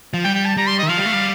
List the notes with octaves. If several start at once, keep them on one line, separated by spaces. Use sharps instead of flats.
F3
G3 G5
G5
A5
G3 A#5
C6
D#5
D#3
F3 F5
G3
A3
G3